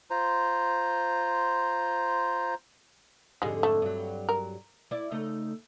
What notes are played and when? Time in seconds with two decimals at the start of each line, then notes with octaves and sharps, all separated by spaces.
0.10 F4 C5 A#5
3.42 F2 G#2 D3 G3 G#3
3.63 A3
3.82 G2 F#3
4.29 A#4
4.91 E4 D5
5.11 C#3 A3 D#4